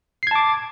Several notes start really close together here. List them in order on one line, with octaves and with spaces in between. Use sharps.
C7 G#6 A5 D6